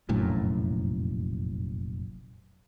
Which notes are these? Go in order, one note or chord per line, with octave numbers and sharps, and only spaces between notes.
F1 A#1 F#2 A2